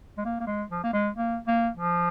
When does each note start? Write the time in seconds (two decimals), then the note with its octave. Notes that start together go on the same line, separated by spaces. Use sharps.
0.18 G#3
0.25 A#3
0.40 A#3
0.47 G#3
0.71 F3
0.84 A#3
0.93 G#3
1.16 A#3
1.47 A#3
1.77 F3